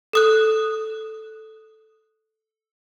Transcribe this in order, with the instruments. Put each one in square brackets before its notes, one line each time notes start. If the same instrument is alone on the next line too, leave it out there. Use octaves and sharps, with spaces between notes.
[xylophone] A4 D#6 F#6